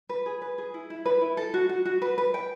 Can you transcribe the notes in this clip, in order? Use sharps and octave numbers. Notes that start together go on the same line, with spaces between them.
B4
G#4
B4
G#4
E4
E4
B4
E4
A4
F#4
F#4
F#4
B4
B4
G5